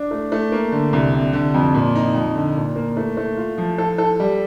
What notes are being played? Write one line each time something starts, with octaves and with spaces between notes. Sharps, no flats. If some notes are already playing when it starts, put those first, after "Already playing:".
Already playing: D4
A3
A3
A#3
D3
C2
C3
D3
F2
A#2
D#4
F2
D3
A#2
A#3
A3
A3
F4
F3
A4
A4
G3